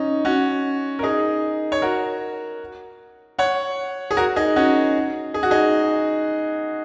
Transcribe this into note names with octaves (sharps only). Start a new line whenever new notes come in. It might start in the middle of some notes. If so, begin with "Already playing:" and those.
Already playing: C#4 D#4
C#4 F#4
A#4
D#4 G#4
C#5
F#4 A#4
C#5 F#5
G#4
F#4 A#4
D#4 G#4
C#4 F#4
G#4
F#4
D#4 G#4